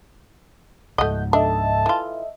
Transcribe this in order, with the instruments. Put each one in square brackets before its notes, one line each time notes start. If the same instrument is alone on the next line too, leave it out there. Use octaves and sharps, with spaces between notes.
[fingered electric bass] C#2 G#2 [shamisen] A3 D#5 [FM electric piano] F#5 G6
[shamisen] D4 [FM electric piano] A4 D#5 E5 [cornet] A5
[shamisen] E3 F4